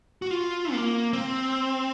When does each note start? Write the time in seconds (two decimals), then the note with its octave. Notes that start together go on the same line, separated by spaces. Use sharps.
0.22 F#4
0.31 F4
0.73 A#3
1.13 C4